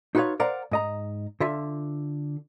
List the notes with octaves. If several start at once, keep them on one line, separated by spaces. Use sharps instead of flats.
D#4 F4 F#4 B4 C#5 F5
A#4 C5 D5 F5 F#5 A#5
G#2 D#5 A#5
D3 F4 E5